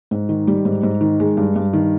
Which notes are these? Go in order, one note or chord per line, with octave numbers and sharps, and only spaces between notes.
G#2
D#3
G3
G#2
G#2
D#3
G#3
G2
G2
D#3